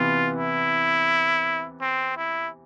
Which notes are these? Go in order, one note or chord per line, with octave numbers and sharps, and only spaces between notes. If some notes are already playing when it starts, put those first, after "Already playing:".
Already playing: C3 E3 B3 F4
E4
C4
E4